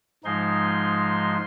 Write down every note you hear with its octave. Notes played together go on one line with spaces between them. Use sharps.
G#2 F3 G#3 D#4 C6